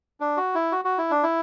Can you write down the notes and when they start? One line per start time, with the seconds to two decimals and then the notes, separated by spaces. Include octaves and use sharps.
0.20 D4
0.37 F#4
0.55 E4
0.72 F#4
0.85 F#4
0.98 E4
1.11 D4
1.23 E4